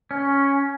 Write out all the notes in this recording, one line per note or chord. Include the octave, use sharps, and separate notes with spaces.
C#4